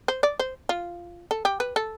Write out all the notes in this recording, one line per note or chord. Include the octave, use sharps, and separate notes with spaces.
C5
D5
C5
F4
A4
G4
B4
A4